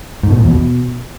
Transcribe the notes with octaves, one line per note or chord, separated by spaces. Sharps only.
G#2
B2
A#2
E2
B2